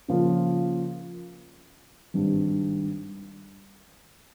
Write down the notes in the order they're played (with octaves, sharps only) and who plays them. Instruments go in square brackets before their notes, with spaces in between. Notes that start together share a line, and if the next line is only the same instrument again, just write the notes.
[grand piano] C#3 F3 A#3 F4
G#1 G2 G3